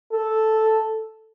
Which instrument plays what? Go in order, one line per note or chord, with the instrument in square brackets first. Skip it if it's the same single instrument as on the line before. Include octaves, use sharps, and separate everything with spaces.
[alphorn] A4